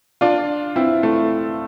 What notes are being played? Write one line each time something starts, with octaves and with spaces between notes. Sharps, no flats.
D4 F4
C4 E4
A3